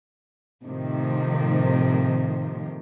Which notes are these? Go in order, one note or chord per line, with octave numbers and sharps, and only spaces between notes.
A2 C3 D#3 F3